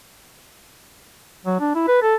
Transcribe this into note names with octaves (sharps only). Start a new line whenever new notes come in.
F#3
D4
E4
B4
A4